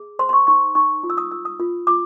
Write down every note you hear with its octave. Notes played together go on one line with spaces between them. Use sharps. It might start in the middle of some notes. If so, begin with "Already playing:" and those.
Already playing: G#4
C5 C6
C6
C#6
D#4 C#6
D#4 C#6
F4
E6
D#6
F4 E6
D#6
F4
F4 D6